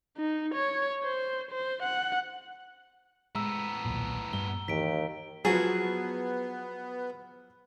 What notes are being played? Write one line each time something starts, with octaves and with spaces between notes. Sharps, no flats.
D#4
C#5
C5
C5
F#5
A2 G#3 B3 A#5 E6
D#1 B1 A#2
G2 G3 G7
D#2 E3 B6 D7
F3 F#3 B3 F#4 G#4 A5